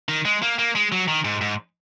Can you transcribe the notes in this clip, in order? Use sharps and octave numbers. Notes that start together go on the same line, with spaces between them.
D#3
G#3
A#3
A#3
G#3
F#3
D#3
G#2
G#2